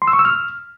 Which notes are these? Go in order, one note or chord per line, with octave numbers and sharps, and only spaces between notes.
C6
E6
C#6
E6
F6